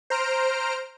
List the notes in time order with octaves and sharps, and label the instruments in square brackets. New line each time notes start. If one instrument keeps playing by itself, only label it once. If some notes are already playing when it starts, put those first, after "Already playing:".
[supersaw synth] C5 A#5 F6 D7